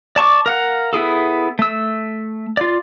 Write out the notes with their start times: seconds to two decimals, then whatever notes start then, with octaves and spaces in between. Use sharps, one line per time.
0.16 D5 A5 C#6 D6
0.46 A#4 F5 F#5
0.93 B3 E4 G#4 A4
1.59 A3 E6
2.57 F4 D5